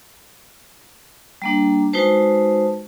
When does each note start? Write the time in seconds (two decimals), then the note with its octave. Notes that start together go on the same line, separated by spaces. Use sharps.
1.42 G3 A#3 D4
1.93 G#3 D#4 F#4 B4 C5 A5